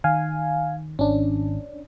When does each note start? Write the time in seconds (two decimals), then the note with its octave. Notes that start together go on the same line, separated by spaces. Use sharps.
0.04 D#3 F5 G#5
0.99 G#1 C#4 D4